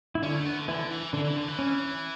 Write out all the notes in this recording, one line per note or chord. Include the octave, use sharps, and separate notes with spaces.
E4
D3 C#4 D4
A3
B3
D3
D3 E3 E4
E3
D3 E3 D4
E3
D3
E3
C#4